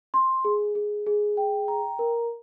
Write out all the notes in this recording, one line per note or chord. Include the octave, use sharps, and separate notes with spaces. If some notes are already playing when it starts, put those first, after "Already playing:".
C6
G#4
G#4
G#4
G5
A#5
A#4